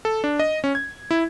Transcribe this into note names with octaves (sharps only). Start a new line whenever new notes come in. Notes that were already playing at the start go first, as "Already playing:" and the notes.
A4
D4
D#5
C#4
G#6
E4